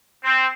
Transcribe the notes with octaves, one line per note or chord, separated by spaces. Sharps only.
C4